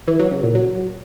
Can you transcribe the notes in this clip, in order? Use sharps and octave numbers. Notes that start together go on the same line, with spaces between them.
E3
F#3
C#3
A#2
F#3